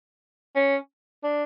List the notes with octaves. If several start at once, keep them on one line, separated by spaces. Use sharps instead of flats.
C#4
D4